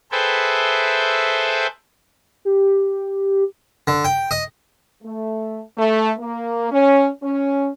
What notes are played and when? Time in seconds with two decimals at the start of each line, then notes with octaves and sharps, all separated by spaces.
0.12 G#4 A4 B4 C5 E5 G5
2.45 G4
3.87 D3
4.05 G5
4.31 D#5
5.03 A3
5.76 A3
6.18 A#3
6.70 C#4
7.22 C#4